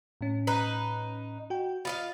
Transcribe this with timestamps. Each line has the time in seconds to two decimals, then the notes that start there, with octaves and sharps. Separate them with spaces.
0.21 A2 C#4
0.47 D#4 B4
1.50 F#4 G5
1.85 F4 D#5 F5 B5